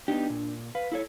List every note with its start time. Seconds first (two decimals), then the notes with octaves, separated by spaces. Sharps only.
0.08 B3 D4 D#4 G4
0.30 A#2
0.75 B4 F5
0.92 E4 A4 C#5